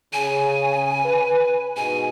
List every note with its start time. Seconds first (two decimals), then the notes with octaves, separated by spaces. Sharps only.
0.13 C#3 G#5
1.05 B4
1.77 G#2 B2 G#5